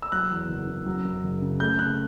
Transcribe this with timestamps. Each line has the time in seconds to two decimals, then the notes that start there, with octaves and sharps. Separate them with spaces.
0.02 E6
0.12 F#3 F#6
0.31 E2
0.48 F#1
0.67 C#3
0.86 F#3
1.05 F#2
1.24 F#1
1.42 C#3
1.60 A3 G6
1.79 C#3 F#6